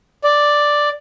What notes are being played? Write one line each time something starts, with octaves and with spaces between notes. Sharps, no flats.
D5